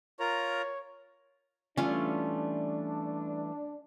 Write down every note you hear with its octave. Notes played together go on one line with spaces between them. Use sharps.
F4 A#4 C#5 A#5
E3 G3 A3 C#4 D4 F4